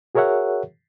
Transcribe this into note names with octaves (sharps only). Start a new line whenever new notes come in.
F#4 G#4 A#4 C#5 E5 F#5